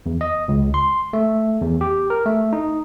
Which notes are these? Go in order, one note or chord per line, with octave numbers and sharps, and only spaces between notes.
E2
D#5
C#2
C6
A3
E2
G4
A#4
A3
D#4